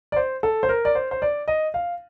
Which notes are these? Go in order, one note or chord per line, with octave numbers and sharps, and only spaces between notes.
D5
C5
A4
C5
A#4
D5
C5
C5
D5
D#5
F5